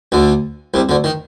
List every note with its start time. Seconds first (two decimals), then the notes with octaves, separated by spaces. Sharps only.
0.12 D2 D3
0.74 C2 C3
0.89 D2 D3
1.04 D#3